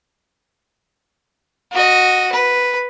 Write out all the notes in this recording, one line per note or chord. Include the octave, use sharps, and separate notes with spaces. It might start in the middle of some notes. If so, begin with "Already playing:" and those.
F#4 D#5
B4